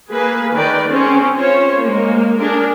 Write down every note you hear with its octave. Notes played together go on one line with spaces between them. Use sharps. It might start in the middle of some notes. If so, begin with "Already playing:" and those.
A#3 G#4 B4
D#3 A#4 B4 D5 G5
C4 C#4 G#4
C#4 F4 C5 C#5
G#3 A#3
D4 G#4 A#4